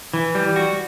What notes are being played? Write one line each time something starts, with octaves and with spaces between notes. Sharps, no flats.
E3
G3
F#4